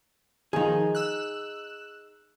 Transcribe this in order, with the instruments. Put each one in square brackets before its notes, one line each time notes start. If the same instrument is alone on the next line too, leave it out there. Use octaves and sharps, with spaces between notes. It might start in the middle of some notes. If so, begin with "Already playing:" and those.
[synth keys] D#3 F3 [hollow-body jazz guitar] D#4 G#4
[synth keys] E6 F#6